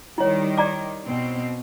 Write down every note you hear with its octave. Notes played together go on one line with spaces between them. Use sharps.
D#3 G3 E4 C#5
D5 A#5 D6
B2 C4